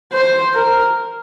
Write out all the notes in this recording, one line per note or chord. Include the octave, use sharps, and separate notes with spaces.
C5
A#4